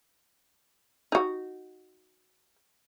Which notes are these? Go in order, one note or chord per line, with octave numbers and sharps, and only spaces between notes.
D#4 F#4